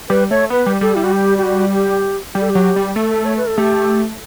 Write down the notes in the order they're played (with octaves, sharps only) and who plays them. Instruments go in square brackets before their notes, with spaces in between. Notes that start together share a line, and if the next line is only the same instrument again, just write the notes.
[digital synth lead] G3 [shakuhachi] B4
[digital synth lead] A3 [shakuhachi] C#5
[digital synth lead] B3 [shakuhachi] B4
[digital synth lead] G3
[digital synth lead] G3 [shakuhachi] A4
[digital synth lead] G3 [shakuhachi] E4
[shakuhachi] F#4
G4
G4
F#4
G4
[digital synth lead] G3 [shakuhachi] G4
[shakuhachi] A4
G4
[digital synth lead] F#3
G3
[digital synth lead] A3 [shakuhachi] A4
[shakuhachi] C#5
B4
A4
[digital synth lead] A3 [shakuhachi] G4